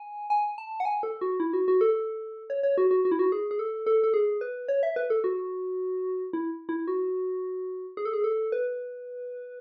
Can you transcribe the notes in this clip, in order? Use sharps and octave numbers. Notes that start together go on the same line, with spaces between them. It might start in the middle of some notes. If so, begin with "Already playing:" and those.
Already playing: G#5
G#5
A5
F#5
G#5
A4
F#4
E4
F#4
F#4
A4
C#5
C#5
F#4
F#4
F#4
E4
F#4
G#4
G#4
A4
A4
A4
G#4
B4
C#5
E5
B4
A4
F#4
E4
E4
F#4
G#4
A4
G#4
A4
B4